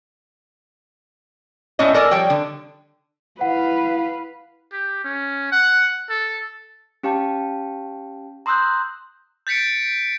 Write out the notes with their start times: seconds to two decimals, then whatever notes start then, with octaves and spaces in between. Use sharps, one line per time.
1.79 A2 A3 C#4 C#5 D#5
1.94 A4 A#4 D5 G#5 A5
2.11 F3 G3 C#5 G5
2.30 D3
3.41 E4 B4 F5 F#5
4.73 G4
5.04 C#4
5.52 F#5
6.10 A4
7.03 C#4 G4 F5 G5 A5
8.46 A#5 C6 D#6 E6 F#6 G6
9.47 G6 A6 B6 C#7 D7